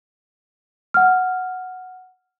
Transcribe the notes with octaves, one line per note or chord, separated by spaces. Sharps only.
F#5 F6